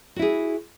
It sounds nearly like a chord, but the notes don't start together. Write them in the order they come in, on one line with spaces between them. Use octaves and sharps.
F#4 E4 G#4